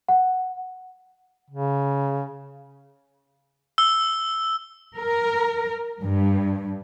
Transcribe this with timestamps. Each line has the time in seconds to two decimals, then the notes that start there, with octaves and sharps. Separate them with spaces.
0.09 F#5
1.50 C#3
3.78 E6 G7
4.97 A#4
6.02 G2